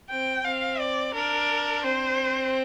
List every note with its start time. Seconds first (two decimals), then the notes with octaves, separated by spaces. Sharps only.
0.10 C4 G5
0.44 C4 F5
0.80 D5
1.14 D4 A#4
1.84 C4 C5